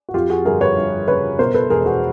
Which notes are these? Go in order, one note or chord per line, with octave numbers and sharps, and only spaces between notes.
F#4
F2 F4 G4
F#4 G#4
G1 G#4 A#4
B4 C#5
G1
C#3 B4 C#5
B2 A#4 C5
A4 B4
E1 G#4 A#4
F#4 G#4